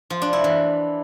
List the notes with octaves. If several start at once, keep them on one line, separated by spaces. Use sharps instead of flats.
F3
D4
E4
E3